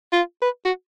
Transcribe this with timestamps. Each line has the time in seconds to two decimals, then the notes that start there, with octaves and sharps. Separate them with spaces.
0.13 F4
0.42 B4
0.65 F#4